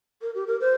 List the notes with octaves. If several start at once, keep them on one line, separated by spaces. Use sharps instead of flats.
A#4
G4
A#4
C5